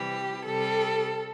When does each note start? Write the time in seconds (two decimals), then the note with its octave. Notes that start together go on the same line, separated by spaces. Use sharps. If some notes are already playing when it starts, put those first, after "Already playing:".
Already playing: C3 E3 G3 G4
0.46 C3 G3 A4